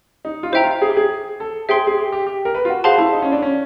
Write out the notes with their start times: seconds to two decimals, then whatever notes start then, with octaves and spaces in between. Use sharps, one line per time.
0.25 D#4
0.43 F4
0.52 E4 C5 E5 G5 A#5
0.63 F4
0.82 G#4
0.90 G4
0.97 G#4
1.40 A4
1.69 G#4 C5 E5 G5 C6
1.87 G#4
1.98 G4
2.12 G4
2.27 G4
2.45 A#4
2.55 B4
2.65 F4
2.70 F#4
2.84 F#4 G#4 C5 F5 A5 C6
2.98 E4
3.13 D#4
3.22 C#4
3.32 D4
3.42 C#4